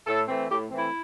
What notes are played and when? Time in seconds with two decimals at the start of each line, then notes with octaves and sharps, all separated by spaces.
0.07 A2 A4
0.28 E3 A3 C4
0.49 A2 G4
0.71 E3 A3 C4
0.77 E4